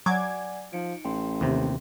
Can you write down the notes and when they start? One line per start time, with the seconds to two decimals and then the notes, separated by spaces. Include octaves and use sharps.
0.06 F#3 D5 F#5 G#5 D6 G#6
0.73 F3 D#4 C#7 D7
1.05 A1 G5 C6
1.41 D#2 C3